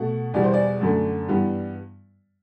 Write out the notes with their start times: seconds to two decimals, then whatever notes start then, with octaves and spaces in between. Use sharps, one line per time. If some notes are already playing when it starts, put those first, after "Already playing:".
Already playing: B2 A3 F#5
0.34 E2 B2 G3 B3 D5
0.44 C5
0.53 D5
0.81 F#2 D3 A3
1.28 G2 E3 G3 B3